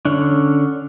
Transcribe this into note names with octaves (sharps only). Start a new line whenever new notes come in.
D3 C#4 D4